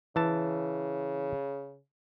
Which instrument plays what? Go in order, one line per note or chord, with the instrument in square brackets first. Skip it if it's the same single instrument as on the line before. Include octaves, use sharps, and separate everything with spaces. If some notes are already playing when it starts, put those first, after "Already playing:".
[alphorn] C#3 [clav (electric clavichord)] E3 A5